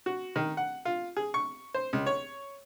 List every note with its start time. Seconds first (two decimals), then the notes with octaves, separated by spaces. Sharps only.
0.06 F#4
0.36 D#3
0.57 F#5
0.85 F4
1.17 G#4
1.34 C#6
1.74 C5
1.93 C#2
2.06 C#5